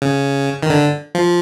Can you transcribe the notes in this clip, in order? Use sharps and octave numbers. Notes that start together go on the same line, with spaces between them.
C#3
D#3
D3
F3